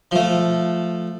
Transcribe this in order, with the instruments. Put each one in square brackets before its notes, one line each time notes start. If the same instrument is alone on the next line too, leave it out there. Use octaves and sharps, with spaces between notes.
[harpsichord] F3 A3